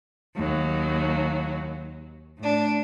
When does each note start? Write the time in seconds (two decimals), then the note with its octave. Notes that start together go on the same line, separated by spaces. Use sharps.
0.35 D#2 F#3
2.38 A2 D4